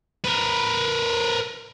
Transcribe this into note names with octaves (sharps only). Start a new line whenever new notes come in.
A#4 B4